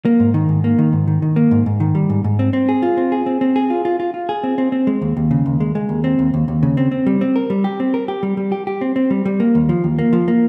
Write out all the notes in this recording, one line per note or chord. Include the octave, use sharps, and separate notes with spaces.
A#3
G#2
D#3
G#2
A#3
D#3
G#2
D#3
D#3
A#3
G#2
G#2
D#3
G3
G#2
G#2
C4
C4
G#4
F4
C4
G#4
C4
C4
G#4
F4
F4
F4
F4
G#4
C4
C4
C4
G#3
D#2
D#2
C#3
D#2
G#3
G#3
D#2
C4
D#2
D#2
D#2
C#3
C4
C4
G3
C4
A#4
G3
G4
C4
A#4
G4
G3
G3
G4
G4
C4
C4
G3
G3
A#3
D#2
F3
D#2
A#3
F3
A#3